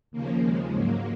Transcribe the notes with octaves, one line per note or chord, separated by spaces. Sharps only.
D#2 C#3 F3 A#3
G#3
G#2 F#3 A#3